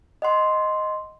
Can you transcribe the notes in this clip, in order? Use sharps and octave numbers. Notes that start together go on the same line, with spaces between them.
D#5 F#5 C6